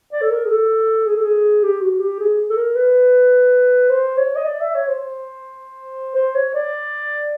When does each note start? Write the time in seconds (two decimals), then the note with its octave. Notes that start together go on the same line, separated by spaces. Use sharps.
0.12 D5
0.22 A4
0.30 A#4
0.45 G#4
0.50 A4
1.06 G#4
1.16 A4
1.24 G#4
1.63 G4
1.81 F#4
2.00 G4
2.20 G#4
2.50 A4
2.56 A#4
2.76 B4
3.89 C5
4.17 C#5
4.36 D#5
4.45 D5
4.60 E5
4.75 C#5
4.88 C5
6.15 C5
6.35 C#5
6.54 D5